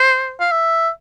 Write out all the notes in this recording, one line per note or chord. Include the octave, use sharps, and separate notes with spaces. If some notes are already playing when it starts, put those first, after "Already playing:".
Already playing: C5
F5
E5